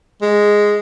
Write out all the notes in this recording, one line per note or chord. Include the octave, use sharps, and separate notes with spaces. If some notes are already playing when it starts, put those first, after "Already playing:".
G#3